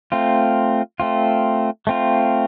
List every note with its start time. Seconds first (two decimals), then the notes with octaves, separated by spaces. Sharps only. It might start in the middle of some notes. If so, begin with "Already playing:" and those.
0.12 A3 C4 F4
1.00 A3 C4 F4
1.87 A3 C4 F4